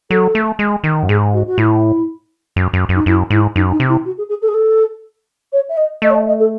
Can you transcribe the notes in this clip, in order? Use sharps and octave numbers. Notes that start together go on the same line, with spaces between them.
F#3 A4
A3
G#3
D#3
F#2
G#2 G#4
F#4
F#4
A2 E4
F#2
F#2
F#2
D#4
F#2 E4
G#2 E4
F#2 D#4
D#4
C3
E4
F#4
G#4
G#4
A4
G#4
A4
C#5
E5
D#5
A3 D#5
C#5
D#5
D#5
A4